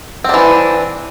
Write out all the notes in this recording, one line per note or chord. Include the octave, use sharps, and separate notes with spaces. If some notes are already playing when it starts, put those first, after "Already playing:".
E3 C4 D4